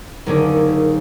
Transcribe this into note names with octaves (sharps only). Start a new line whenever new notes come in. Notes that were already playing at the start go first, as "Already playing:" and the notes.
F#1 D#2 D3 C#4 D#4 D6